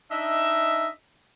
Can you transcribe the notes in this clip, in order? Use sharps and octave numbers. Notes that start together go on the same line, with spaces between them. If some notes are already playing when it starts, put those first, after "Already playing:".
D4 D#4 D#5 E5